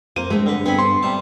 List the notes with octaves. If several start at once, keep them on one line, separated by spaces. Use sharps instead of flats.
F2 A#3 C5 D#7
G2 G#3 A3 C4
D3 B4
B3 C4 G#5 B5
C5 C6
C3 G3 A5